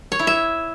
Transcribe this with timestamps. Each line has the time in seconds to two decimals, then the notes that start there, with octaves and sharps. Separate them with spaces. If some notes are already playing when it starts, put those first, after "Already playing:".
0.12 C#5
0.19 E4
0.27 E5